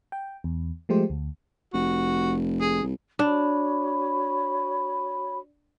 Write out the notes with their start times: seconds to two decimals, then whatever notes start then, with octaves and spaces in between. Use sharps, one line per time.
0.12 G5
0.44 E2
0.89 F3 G#3 A3 G4 C5
1.10 D2
1.73 F1 F#4
2.61 G#4
2.83 C2
3.19 D4 F#4 C#5 B5